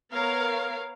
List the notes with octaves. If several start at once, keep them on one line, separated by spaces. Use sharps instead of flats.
B3 A#4 C#5 F5